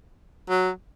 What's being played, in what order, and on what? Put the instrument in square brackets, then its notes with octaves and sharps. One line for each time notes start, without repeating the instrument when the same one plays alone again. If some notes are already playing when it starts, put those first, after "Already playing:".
[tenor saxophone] F#3